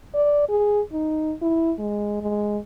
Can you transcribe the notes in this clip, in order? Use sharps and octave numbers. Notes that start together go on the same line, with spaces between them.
D5
G#4
D#4
E4
G#3
G#3